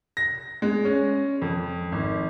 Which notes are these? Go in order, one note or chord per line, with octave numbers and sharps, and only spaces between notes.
A#6
G#3
C#4
F2
G#1